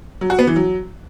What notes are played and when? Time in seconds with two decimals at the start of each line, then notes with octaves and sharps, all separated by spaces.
0.21 F#3
0.30 F#4
0.39 B3
0.47 E3
0.56 F#3